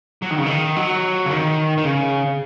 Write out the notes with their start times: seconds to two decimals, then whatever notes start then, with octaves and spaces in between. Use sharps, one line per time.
0.22 F#3
0.31 D#3
0.38 C#3
0.46 D#3
0.77 F#3
1.26 C#3
1.31 D#3
1.77 D#3
1.84 C#3